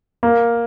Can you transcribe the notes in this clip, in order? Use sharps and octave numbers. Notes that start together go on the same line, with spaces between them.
A#3